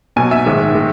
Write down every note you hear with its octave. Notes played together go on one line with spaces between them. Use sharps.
B1 B2 F#3 G#5
E5
A#1 G#2 D#3 G#3
D#3 G#3